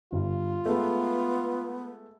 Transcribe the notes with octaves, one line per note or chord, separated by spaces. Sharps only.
G1 G2 F4
G#3 A3 B3